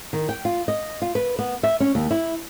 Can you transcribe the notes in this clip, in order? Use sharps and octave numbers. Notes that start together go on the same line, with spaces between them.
D#3
G5
F4
D#5
F4
B4
B3
E5
C#4
D#2
E4